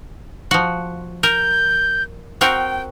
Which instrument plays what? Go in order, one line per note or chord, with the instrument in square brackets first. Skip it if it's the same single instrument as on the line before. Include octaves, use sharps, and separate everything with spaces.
[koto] F3 F#4
[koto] A#4 [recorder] G6
[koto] C4 F#4 A#4 [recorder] G5